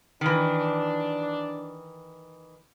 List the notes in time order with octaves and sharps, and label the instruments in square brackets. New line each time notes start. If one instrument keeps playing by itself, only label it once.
[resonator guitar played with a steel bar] D#3 E3 [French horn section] D4